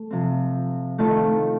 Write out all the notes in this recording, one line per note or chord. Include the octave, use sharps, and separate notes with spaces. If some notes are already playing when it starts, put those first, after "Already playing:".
Already playing: A3
C3 F3 C4
D#3 A3 C4 F4 A4